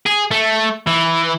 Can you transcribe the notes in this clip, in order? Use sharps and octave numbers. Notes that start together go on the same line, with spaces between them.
G#4
A3
E3